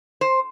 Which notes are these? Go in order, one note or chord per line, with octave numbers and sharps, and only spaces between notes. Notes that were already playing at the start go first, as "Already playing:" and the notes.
C5